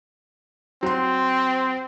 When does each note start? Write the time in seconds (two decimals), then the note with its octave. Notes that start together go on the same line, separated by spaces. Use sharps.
0.83 F#3 C4 C6